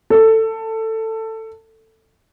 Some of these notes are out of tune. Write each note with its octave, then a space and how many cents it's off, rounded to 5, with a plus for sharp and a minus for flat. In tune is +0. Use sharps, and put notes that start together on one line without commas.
A4 +15